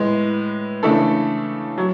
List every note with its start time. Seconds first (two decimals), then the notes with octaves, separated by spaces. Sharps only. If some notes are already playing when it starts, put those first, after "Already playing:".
Already playing: A2 G#3 B3
0.83 C#3 E3 A3 D4 A4
1.78 F#3